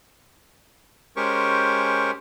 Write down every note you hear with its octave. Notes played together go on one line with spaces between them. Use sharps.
G#3 C#4 G4 A#4 C5 C#6